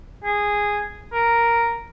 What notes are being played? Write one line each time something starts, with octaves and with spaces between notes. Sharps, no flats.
G#4
A#4